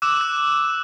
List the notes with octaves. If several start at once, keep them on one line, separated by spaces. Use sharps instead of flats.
D6 E6 F#6 E7
F#6